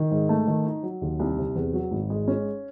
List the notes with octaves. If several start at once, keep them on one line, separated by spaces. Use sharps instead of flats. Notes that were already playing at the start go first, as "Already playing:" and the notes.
Already playing: D#3
G#2
A3
D#3
D#4
F#3
D#2
C2
C3
E2
F#3
G#1
G#3
C#4